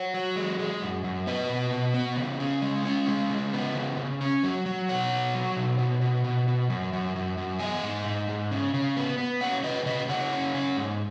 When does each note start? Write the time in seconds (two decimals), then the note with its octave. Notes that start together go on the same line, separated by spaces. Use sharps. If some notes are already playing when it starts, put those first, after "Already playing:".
Already playing: C#5 F#5
0.14 F#3
0.36 G#3
0.59 G#3
0.82 F#2
1.04 F#2
1.27 B3 B4 D#5
1.50 B2
1.73 B2
1.94 B3
2.17 C#3
2.40 C#4
2.62 G#3
2.85 C#4
3.08 G#3
3.30 C#3
3.53 B3
3.76 C#3
3.98 C#3
4.21 C#4
4.43 F#3
4.66 F#3
4.89 B2 C#5 F#5
5.12 B2
5.35 F#3
5.56 B2
5.79 B2
6.01 B2
6.24 B2
6.48 B2
6.70 F#2
6.93 F#2
7.16 F#2
7.38 F#2
7.60 B3 D#5 G#5
7.83 G#2
8.06 G#2
8.29 G#2
8.51 C#3
8.74 C#3
8.97 B3
9.18 B3
9.41 C#3 C#5 F#5
9.63 C#3 B4 D#5
9.86 C#3 B4 D#5
10.08 C#3 C#5 F#5
10.32 C#4
10.54 C#4
10.77 G#2